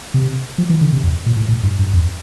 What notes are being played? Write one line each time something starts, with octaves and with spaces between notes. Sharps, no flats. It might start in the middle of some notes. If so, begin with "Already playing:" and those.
C3
F3
E3
D3
C3
F2
A#2
A2
A2
G2
G2
F2